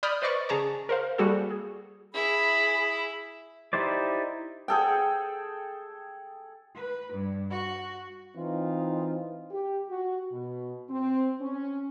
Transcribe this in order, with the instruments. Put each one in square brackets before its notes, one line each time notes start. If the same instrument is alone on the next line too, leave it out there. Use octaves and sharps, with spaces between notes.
[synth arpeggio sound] D5 B5 D#6 F6 G6
B4 C5 D5 D#5 C#6 A6
C#3 G#4 A5 A#5 C#6
A#4 C5 F5
G3 A#3 F#4 G#4 A4
G#4
[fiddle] E4 [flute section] G#4 B5
[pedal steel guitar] D#4 E4 G4 C5 D5
[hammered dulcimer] G#4 A4 G5
[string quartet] B4
G2
F#4
[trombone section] E3 C4 D#4 F4
[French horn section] G4
F#4
B2
C4
C#4